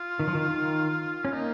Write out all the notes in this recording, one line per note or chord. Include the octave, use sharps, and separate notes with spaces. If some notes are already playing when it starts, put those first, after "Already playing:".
Already playing: F4
D#3
F3
D#3
D#3
C#4
A#3 D#4